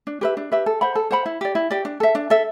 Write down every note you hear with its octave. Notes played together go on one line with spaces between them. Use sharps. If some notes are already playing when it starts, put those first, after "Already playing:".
D4
G4 B4 E5
D4
G4 B4 E5
A4
C5 F#5 B5
A4
C5 F#5 B5
E4
G4 D5
E4
G4 D5
D4
A4 E5
D4
A4 E5